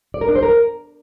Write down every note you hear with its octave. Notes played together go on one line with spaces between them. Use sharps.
D5
A#4
D4
C5
A#4